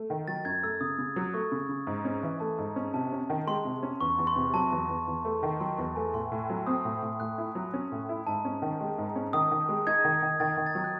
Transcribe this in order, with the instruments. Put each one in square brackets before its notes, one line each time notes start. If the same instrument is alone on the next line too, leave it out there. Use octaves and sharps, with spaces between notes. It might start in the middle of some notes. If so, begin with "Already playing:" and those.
Already playing: [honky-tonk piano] A3
D#3
[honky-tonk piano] F#3 [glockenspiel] A6
[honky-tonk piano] F#2 [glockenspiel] G#6
[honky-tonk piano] A3 [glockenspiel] E6
[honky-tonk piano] C#3 [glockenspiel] D#6
[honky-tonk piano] C#3
F#3
[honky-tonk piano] A3 [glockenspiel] C#6
[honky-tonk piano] C#3
C#3
G#2
C#4
E3
[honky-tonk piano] A3 [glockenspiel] A5
[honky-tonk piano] G#2
C#4
[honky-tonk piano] C3 [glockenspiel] A5
[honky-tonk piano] C#4
D#3
[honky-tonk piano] G#3 [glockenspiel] C6
[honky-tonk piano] C3
C#4
[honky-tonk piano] E2 [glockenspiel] C#6
[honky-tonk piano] E2
[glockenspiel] C6
[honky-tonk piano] C3
[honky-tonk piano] F#3 [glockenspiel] A5
[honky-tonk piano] E2
E2
E2
A3
D#3
[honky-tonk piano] F#3 [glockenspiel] C6
[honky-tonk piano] E2 [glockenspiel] C6
[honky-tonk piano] A3 [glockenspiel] G#5
[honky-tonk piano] A2 [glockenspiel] C6
[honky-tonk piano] A2
F#3
[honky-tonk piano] C4 [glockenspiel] D#6
[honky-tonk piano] A2
A2
[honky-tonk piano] A2 [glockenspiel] F#6
[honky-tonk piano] E4
F#3
C#4
A2
E4
[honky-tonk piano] G#2 [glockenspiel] A5
[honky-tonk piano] C#4
D#3
G#3
G#2
C#4
[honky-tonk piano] D#3 [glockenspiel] D#6
[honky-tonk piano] D#3
G#3
[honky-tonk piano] D#4 [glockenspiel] G#6
[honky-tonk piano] D#3
D#3
[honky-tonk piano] D#3 [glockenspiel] A6
[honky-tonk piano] D#3
[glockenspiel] A6
[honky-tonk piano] F#3
[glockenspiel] F#6